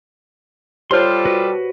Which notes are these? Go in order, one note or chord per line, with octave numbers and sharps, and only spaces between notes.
G3 F4 G4 A4 C5 C#5 C6 F6
F#4 B4